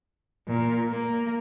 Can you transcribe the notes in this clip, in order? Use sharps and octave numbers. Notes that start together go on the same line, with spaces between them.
A#2
A#3